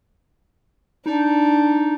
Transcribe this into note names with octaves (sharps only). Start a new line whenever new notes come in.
D4 D#4